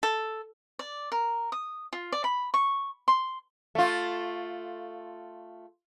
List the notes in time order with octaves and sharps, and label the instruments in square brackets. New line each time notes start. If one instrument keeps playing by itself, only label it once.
[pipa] A4
[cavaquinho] D5
A#4
D#6
F4
D5
B5
C#6
C6
[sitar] A3 F4